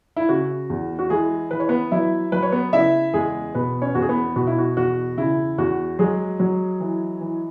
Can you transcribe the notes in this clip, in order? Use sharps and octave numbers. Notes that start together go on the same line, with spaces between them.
E4
C#3 F#4
E2
F#4
E3 G#3 G#4
E3 B4
C#5
B3 B4
F#3 E4 E5
F#3 B4
C#5
B3 B4
C#3 E4 E5
E2 G#3 G#4
B2 B3 B4
C#4 C#5
E2 F#4
G#4
B3 B4
B2 F#4
E4
F#4
E2 F#4
C#3 E4
E2 F#4
F#3 G#3 G#4
F#3
E3
E3